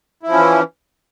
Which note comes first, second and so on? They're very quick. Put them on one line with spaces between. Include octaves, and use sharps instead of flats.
E4 F3 C#4 E3